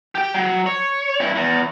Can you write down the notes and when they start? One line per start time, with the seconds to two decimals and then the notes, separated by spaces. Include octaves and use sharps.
0.15 G4 G5
0.34 F#3
0.66 C#5
1.21 G2 E4
1.35 E2